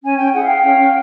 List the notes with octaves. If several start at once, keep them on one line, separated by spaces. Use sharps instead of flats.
C#4 G#5
G5
E4 G#4 F#5
F5 G5
C#4